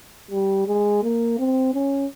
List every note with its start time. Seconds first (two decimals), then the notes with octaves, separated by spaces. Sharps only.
0.31 G3
0.67 G#3
1.03 A#3
1.38 C4
1.74 C#4